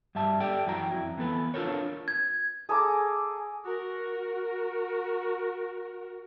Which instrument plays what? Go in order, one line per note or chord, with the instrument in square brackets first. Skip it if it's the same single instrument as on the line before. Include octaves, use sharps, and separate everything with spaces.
[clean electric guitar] G2 G3 E5 A5
G4 A4 D5 G5
F#2 E3 F#4 G5 A#5
F2 E4
E3 B3 A4 B4
D4 F4 G4 A4 A#4 C#5
[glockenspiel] G#6
[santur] G#4 A4 A#5 D6
[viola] F#4 A#4